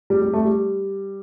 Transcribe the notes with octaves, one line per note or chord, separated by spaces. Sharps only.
G3
G3
A3
G3